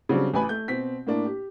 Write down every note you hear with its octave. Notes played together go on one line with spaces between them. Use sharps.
C#3 F#3 G3 C4 D4
A1 B4 G#5 B5
A3 G6
B2 C4 B6
A2 A#3 D4
G4